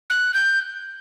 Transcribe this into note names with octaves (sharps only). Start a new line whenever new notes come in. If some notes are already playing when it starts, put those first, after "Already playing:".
F#6
G6